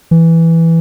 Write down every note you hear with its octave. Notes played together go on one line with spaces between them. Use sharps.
E3